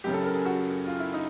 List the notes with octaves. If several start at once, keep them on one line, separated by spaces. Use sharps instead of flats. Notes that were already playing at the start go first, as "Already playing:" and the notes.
F#1 F#2 C#3 G4
A4
A#4
G#4
F#4
F4
E4
D#4